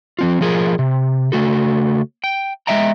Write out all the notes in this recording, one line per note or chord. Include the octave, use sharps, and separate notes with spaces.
F3 C4 F4
F3 F4 G#4 A#4
C3
C#3 A3 F#4 A4
G5
G#3 C4 D#5 E5 G5 A#5